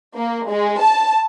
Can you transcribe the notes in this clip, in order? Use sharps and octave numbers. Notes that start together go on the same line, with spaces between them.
A#3
G#3
A5